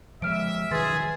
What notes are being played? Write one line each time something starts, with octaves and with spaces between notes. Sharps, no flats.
F3 G#3 E5 F6 D7
D#3 F#3 G#4 B4 C6 A6